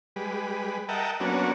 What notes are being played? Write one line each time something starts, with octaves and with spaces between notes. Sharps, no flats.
G3 G#3 B4
A#4 D#5 E5 F#5 G5 A5
F#3 A#3 B3 C#4 D4 F#4